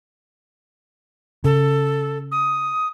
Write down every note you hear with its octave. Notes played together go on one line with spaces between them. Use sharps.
C#3 A4
D#6